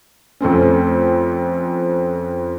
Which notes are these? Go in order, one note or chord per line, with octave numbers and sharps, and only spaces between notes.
F2 A3 C4 C#4